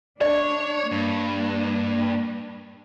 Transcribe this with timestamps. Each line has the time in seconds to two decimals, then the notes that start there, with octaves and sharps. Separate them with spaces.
0.21 D4 C#5 D5
0.91 G2 A#3